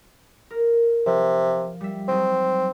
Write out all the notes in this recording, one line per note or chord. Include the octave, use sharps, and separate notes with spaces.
A#4
C3 F3
G3 E5
F#3 C4 D#4